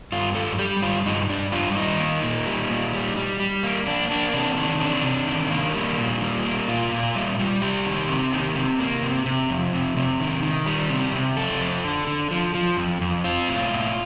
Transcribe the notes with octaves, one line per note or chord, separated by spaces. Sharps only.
G2 F4
G3 A4
G3 G4
G2 F4
G2 D#4
G2 D4
G3 F4
D#3 D#4
A#3
A#2
G3
A#2
G3
G3
G3
A#3
A#3 D4
A#3 D4
C3 D4
D#3 D4
C3 D4
C3
D#3
A#3
G3
A#2
G3
A#3
A#2 F4
A#2
G3
G3
C3 G4
D#3
C3
D#3
C3
A#3
C3
C3
F2
C3
C3
D#3
D#3
G3
C3
C3
F2 A4
F2
D3
D3
F3
F3
F2
F2
C4 F4
A2
A2